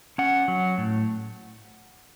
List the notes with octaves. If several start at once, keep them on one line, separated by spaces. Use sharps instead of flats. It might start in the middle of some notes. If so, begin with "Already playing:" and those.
C#4 F#5
F#3
A2